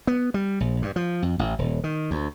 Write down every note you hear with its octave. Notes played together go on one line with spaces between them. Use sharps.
B3
G3
A#1
G2
F3
F2
A1
D#1
D#3
D2